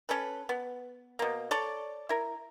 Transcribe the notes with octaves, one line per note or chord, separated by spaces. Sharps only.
C#4 A4 B4
B3
B2 A#3
A4 C#5 D5
E4 A#4